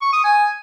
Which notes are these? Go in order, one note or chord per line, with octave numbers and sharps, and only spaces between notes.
C#6
D#6
G#5